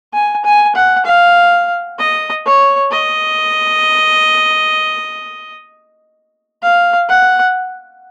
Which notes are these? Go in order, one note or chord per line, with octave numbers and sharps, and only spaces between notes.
G#5
G#5
F#5
F5
D#5
C#5
D#5
F5
F#5